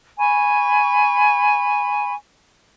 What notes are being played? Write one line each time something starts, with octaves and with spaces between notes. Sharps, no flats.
G#5 B5 C#6